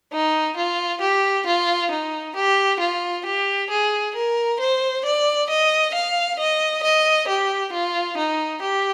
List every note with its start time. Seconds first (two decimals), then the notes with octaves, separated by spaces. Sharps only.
0.13 D#4
0.57 F4
1.01 G4
1.46 F4
1.91 D#4
2.36 G4
2.81 F4
3.25 G4
3.70 G#4
4.15 A#4
4.60 C5
5.05 D5
5.50 D#5
5.94 F5
6.39 D#5
6.83 D#5
7.28 G4
7.73 F4
8.17 D#4
8.62 G4